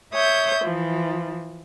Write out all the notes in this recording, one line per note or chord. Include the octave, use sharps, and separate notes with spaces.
C#5 E5 D#6 G6
E3 F3